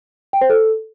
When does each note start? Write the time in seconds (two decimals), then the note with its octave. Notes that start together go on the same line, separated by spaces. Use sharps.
0.33 G5
0.41 C5
0.50 A4